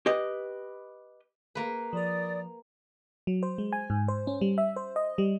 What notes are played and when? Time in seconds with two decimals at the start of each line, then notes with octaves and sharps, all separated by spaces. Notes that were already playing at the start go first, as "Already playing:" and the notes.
0.06 G4 B4 D#5
1.55 A#3 B4
1.93 F3 A#4 D5 D#6
3.27 F#3
3.43 C5
3.58 G#3
3.73 G#5
3.90 G#2
4.08 C5
4.27 C#4
4.41 G3
4.58 E5
4.76 C5
4.96 D#5
5.18 G3